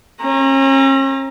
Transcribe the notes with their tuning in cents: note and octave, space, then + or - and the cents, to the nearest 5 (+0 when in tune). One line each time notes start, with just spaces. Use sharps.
C#4 -40 A#5 +0